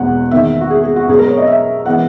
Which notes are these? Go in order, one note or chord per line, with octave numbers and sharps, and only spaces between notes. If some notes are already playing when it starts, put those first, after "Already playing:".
Already playing: E1 E2 B2 A#3 F#5
E2 D#3 A#3 E5
F#4
G#4
G#4
F#4
B1 B2 G#3 B3 G#4
A#4
C#5
D#5
E5
E3 G#3 B3 F#5